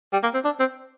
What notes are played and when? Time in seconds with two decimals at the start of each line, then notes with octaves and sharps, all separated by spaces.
0.13 G3
0.23 A#3
0.34 C4
0.45 D4
0.60 C4